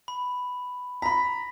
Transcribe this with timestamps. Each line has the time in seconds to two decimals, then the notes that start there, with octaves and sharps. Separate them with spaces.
0.08 B5
1.02 A#5 B5 B6